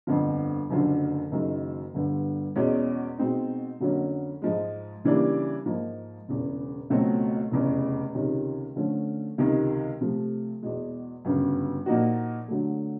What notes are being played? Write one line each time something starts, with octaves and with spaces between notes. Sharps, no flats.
G1 F2 D3 F3
F#1 F#2 D3 F3
F#1 F#2 D#3 G#3
G1 G2 D3
E2 B2 G#3 C#4
B2 G#3 C4 D#4
F2 D3 F#3 A#3 C#4
G#2 F3 G#3
C#3 E3 G3 A#3 D4
G#2 F3 A#3
E1 E2 C#3
C#2 B2 F#3 A3 C4
F1 E2 C#3
C#2 C3 D#3 G#3 C#4
D3 F3 A3 C#4
C#2 C3 D#3
C3 F3 A3
E2 B2 G#3
G1 F#2 C#3
A#2 F3 A#3 D#4 F#4
D3 F#3 A3